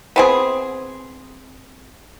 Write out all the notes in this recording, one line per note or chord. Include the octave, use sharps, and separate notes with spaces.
B3 C4 G#4